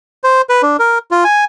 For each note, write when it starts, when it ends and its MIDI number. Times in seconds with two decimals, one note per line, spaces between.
0.24 0.42 72
0.49 0.62 71
0.63 0.77 62
0.79 0.98 70
1.11 1.24 65
1.24 1.44 80